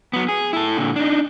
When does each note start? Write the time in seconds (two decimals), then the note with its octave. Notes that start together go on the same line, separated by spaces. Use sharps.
0.13 F#3 B3
0.29 G#4
0.53 E4 A4
0.77 A#2 D3
0.96 D4 D#4